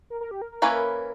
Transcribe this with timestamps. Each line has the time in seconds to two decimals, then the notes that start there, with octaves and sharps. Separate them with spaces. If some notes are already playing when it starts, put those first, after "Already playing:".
0.10 A#4
0.21 A#4
0.31 G4
0.42 A#4
0.52 A#4
0.62 E3 A#3 C#4 E4 B4